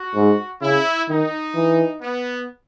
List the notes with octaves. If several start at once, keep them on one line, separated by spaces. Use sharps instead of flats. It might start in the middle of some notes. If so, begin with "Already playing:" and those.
Already playing: F#4
G#2
C#3 E4
D#3 D#4
E3
B3